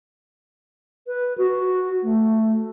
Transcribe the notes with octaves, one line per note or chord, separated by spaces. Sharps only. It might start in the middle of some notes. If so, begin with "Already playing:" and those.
B4
F#4
A3